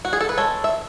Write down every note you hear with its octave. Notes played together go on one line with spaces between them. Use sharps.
F#4
G#4
A4
B4
G#3 A4 C#5
E5